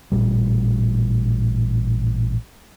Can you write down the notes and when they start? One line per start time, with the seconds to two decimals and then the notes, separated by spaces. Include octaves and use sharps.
0.12 A1 A#2 G3